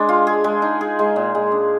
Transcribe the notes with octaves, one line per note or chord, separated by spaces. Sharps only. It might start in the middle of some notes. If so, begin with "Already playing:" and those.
Already playing: G#3 D4
F4
G#4
G#3
D#4
G#4
G#3
A#2
G#3
D4